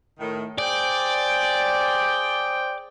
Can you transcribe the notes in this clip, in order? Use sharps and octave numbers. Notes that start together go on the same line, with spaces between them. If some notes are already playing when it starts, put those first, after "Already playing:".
A2 D#3
G#4 C5 D5 G5